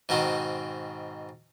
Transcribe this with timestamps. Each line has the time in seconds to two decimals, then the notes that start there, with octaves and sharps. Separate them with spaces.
0.09 G#2 B2 D#3 C4